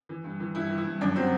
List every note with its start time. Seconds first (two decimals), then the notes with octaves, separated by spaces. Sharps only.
0.09 E3
0.24 G2
0.40 E3
0.55 G2 E4
0.70 E3
0.78 E4
0.85 G2
1.01 F#2 D4
1.16 F#3 C4